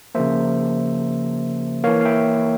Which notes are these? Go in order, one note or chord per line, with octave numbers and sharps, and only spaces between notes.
C#3 F3 A#3 C5 E5
E3 A#3 C#5 F5
F5
E5 G5